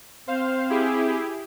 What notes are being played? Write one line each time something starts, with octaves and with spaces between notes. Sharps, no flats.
C4 C5 F5
E4 G4 G#4